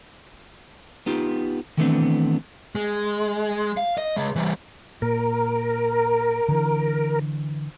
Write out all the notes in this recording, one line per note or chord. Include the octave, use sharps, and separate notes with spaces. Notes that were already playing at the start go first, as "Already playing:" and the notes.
B3 D#4 F4 G4
D#3 E3 A3 B3 C4 D4
G#3
F5
D#5
C#3 G#3
E3 G3
A#2 A#4
D3 E3